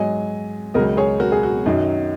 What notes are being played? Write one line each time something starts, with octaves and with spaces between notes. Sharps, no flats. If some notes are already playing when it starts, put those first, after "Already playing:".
Already playing: G#2 F#3 D#5 G#5
C#2 C#3 F#3 A#4 D#5
G#4 C#5
F#4 A#4
G#4
F#4
F#2 D#3 F#3 D#4